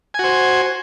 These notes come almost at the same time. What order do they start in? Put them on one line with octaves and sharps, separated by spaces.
G#5 F#4 C5